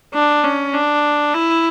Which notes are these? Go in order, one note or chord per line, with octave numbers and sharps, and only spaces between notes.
D4
C#4
D4
E4